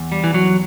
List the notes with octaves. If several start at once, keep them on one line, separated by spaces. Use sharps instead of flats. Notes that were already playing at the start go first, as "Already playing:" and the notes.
Already playing: E2
G3
E3
F#3